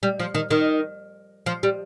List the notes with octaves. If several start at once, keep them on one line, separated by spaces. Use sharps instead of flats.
G3
F3
D#3
D#3
F3
G3